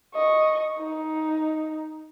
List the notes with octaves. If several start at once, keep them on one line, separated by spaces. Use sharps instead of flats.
D#5 C#6
D#4